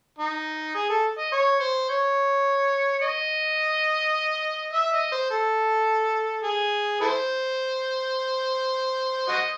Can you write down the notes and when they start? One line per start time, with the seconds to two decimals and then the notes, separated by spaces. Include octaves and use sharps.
0.19 D#4
0.75 G#4
0.90 A4
1.18 D#5
1.32 C#5
1.60 C5
1.89 C#5
3.02 D#5
4.73 E5
4.92 D#5
5.12 C5
5.31 A4
6.44 G#4
7.01 E4 A4 C5
9.28 F#4 C5 D#5